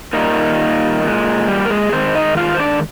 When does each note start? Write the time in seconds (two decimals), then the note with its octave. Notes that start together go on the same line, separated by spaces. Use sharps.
0.13 A#2 D#3 G3 A#3 D#4
1.03 A#2 G#3
1.48 G3 G4
1.65 A#4
1.70 G#3 G#4
1.92 D#3 G#3 C4 C5
2.15 D#4 D#5
2.37 F4 F5
2.55 C5
2.59 D4 D5